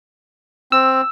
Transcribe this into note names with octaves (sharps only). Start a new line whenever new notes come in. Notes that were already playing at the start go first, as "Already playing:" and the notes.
C4 E6